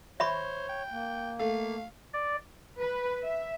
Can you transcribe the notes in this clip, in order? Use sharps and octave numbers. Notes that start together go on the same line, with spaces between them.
C5 C#5 E5 B5 C#6
G5
A#3
A3 F5
D5
B4
E5